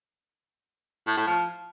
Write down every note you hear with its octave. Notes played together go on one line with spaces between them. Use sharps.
A2
A2
F3